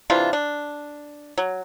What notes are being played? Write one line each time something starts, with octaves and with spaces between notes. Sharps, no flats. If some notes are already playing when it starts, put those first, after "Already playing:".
C3 E3 D4 F4
D4
F#3